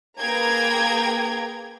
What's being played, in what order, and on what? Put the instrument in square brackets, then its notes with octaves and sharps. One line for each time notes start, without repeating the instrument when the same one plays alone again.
[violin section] A#3 G#4 B4 G5 A#5 G#6